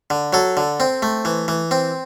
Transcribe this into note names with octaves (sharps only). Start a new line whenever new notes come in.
D3
F#3 A4
D3
C4
A3
E3
E3
C4